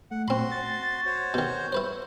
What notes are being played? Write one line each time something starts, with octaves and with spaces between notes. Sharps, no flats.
A3 F#5
A#2 C4 F#4 B5 C6
A6
F#4 C5 C#5
B2 D#3 G6
E4 B4 C5